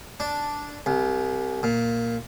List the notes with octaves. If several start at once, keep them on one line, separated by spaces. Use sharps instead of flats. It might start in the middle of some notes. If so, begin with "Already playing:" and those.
D4
C2
A#2